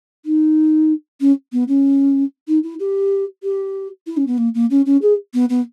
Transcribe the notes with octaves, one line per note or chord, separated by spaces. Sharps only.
D#4
C#4
B3
C#4
D#4
E4
G4
G4
E4
C#4
B3
A#3
A#3
C#4
C#4
G#4
B3
B3